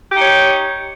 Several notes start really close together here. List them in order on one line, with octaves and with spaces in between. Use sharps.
G4 D#4 C#5